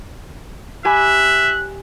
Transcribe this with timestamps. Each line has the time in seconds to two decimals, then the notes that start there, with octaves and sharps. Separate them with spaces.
0.85 G4 E5 G#5 B5 F#6